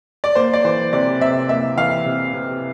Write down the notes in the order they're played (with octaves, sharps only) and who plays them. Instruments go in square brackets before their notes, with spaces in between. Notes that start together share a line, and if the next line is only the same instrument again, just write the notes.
[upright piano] D5
[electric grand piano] A#3 [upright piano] C5
[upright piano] D5
[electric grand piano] E3 [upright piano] C5
[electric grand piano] C3 [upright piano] D5
[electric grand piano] C3 [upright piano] E5
[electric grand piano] A#3 [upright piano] E5
[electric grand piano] E3 [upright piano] F5
[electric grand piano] C3
C3